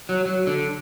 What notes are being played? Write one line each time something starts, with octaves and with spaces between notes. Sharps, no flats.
F#3
F#3
D3